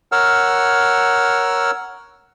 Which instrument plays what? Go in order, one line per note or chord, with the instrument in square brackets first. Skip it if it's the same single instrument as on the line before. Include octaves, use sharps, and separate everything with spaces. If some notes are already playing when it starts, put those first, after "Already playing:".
[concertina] A#4 C#5 F#5 E6 F6